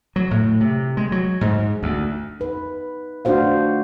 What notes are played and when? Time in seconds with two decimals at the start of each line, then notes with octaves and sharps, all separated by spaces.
0.16 F#3
0.31 A2
0.61 C3
0.97 G#3
1.12 F#3
1.41 G#2
1.83 D2
2.40 D#4 B4
3.25 A3 D4 F4 F#4 C5 F5